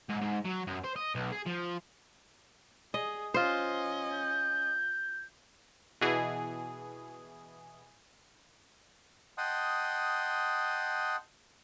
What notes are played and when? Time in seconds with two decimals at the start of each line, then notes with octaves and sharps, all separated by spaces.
0.10 G#2
0.22 G#2
0.45 F#3
0.68 F#2
0.84 C5
0.96 D#5
1.15 B1
1.32 G#4
1.46 F3
2.94 G#4 D#5
3.34 C#4 F4 C5 D#5
4.11 G6
6.01 B2 E3 G#4
9.38 D#5 F#5 G5 A5 C6 D#6